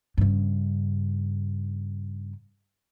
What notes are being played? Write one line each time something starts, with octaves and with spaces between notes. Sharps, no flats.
G2 C#3